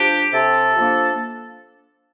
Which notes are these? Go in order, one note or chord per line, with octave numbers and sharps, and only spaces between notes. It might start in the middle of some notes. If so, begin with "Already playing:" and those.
Already playing: F3 D4 G4
C3 A4
F3 A#3 D4